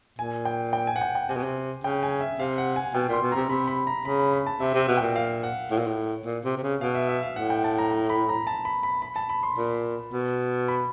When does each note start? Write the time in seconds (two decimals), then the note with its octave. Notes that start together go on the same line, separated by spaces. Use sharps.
0.19 A#2 G#5
0.45 G5
0.73 G5
0.87 G#5
0.96 F#5
1.01 G5
1.15 G5
1.29 C3 G#5
1.36 B2
1.43 C3
1.84 C#3 G5
2.03 G#5
2.21 E5
2.39 C3 F5
2.58 F#5
2.76 G#5
2.94 B2 G5
3.08 A#2
3.13 C6
3.22 B2
3.32 C3 A#5
3.50 C3 B5
3.68 B5
3.87 A#5
4.05 C#3 B5
4.19 B5
4.33 B5
4.46 A5
4.60 C3 E5
4.74 C3
4.79 E5
4.88 B2
4.97 A#2 G5
5.16 F5
5.43 F#5
5.71 A2
5.79 A#2
5.87 A2
6.25 A#2
6.44 C3
6.57 C3
6.63 C#3
6.81 B2 F5
6.95 E5
7.09 E5
7.23 F5
7.36 A2 F#5
7.50 G5
7.64 A5
7.78 A#5
7.92 A#5
8.10 B5
8.29 A#5
8.47 A5
8.65 B5
8.83 B5
9.02 B5
9.16 A5
9.29 B5
9.43 C6
9.57 A#2
10.13 B2
10.68 B5